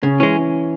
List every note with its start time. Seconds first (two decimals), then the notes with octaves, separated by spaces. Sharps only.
0.02 C#3 C#4
0.19 E3 G#3 C#4